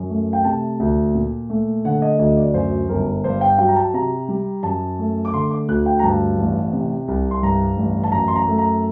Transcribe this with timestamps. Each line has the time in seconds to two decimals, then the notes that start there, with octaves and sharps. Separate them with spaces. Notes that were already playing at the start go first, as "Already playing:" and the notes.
Already playing: F#2
0.10 A3
0.33 G5
0.44 C3 A5
0.80 D2
1.15 A#2
1.50 A3
1.85 D3 F#5
2.02 D#5
2.19 D2 D#5
2.37 D5
2.54 F#2 C5
2.89 G1 A#4
3.24 G2 C5
3.41 G5
3.58 F#3 G5
3.68 A#5
3.76 A5
3.94 C3 A#5
4.28 G3
4.63 F#2 A5
4.99 A3
5.25 D6
5.33 D3 C6
5.51 D6
5.68 D2 F#6
5.86 G5
5.99 A#5
6.03 G2 A5
6.38 A1
6.73 C3
7.08 C2
7.31 C6
7.42 G2 A#5
7.77 A1
8.04 A5
8.12 F#2 A#5
8.28 C6
8.36 A#5
8.47 A3
8.58 A#5